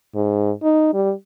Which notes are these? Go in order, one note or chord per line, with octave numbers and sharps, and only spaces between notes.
G#2
D#4
G3